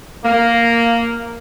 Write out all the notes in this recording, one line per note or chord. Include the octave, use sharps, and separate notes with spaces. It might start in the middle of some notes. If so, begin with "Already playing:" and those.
A#3